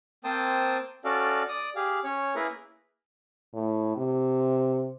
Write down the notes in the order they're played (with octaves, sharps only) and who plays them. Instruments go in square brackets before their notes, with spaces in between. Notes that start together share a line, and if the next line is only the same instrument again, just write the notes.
[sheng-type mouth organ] A#3 C4 C5 G5 A5 D#6
C#4 F#4 A4 D5 F5
D5 D#6
G4 G#4 F5
C#4 C#5
A#3 E4 G#4 A#4 B4
[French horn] A2
C3